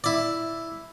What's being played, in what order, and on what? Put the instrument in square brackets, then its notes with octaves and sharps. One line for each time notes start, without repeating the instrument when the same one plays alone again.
[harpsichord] E4 D5